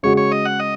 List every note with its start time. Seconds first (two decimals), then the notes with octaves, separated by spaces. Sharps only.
0.03 C#3 G#3 F#4 C#5
0.17 C#5
0.32 D#5
0.45 F#5
0.60 D#5